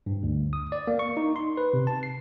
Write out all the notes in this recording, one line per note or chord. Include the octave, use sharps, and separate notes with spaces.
G2
D2
D#6
D5
A#3
C#6
D#4
C6
B4
C3
A5
C7